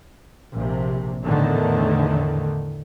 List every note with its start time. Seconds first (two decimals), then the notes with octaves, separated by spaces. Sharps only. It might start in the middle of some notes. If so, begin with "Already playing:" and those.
0.53 A#1 C3
1.25 E2 A2 D3 D#3